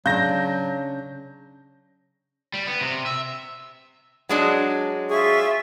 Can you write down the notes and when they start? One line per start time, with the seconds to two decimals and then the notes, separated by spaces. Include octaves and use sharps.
0.06 C#3 F#3 D4 F5 G6 A#6
2.54 G3
2.67 B3
2.81 C3
3.06 E5
4.29 F#3 G#3 D4
5.10 F4 G#4 E5 C#6